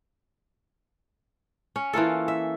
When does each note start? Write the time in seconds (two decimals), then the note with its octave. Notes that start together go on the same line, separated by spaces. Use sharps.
1.76 C#4
1.93 E3 A#3 F4 A4
2.28 E5